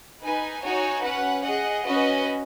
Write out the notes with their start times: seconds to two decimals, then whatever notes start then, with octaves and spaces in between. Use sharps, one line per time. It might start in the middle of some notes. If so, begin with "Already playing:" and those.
0.24 D#4 B4 G#5
0.64 D#4 F#4 C#5 G#5
1.05 C#4 B4 F#5
1.46 G#4 D#5 F#5
1.86 C#4 F#4 B4 D#5